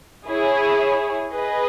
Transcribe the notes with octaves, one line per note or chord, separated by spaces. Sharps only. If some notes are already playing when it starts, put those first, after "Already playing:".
E4 G#4 C#5
G#4 B4 D#5